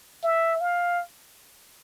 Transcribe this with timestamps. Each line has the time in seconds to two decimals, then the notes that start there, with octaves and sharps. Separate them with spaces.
0.23 E5
0.61 F5